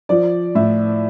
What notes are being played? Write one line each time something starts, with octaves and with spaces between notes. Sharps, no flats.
F3 D5
A2 E5